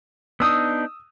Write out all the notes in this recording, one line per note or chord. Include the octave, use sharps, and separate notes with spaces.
B3 D4 D#4 D#6 E6